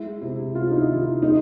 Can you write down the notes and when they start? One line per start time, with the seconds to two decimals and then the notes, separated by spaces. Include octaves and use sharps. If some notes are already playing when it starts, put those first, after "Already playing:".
Already playing: G#3 E4
0.22 C3 E4
0.55 C3 F4
0.71 D#4
0.77 E4
0.89 D#3 F4
1.00 E4
1.22 G#3 D#4